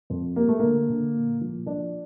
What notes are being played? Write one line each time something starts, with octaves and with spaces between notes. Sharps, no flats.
F2
G3 A#3
A3
D3 A#3
D3
A#2
F3
F3 D4